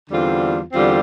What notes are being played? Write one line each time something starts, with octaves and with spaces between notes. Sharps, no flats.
E2 D3 G3 C4 F4
E2 D3 G3 C4 F4